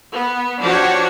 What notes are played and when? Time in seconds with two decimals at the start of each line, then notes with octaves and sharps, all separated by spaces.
0.12 B3
0.61 F3 D4 F#4 G4 C#5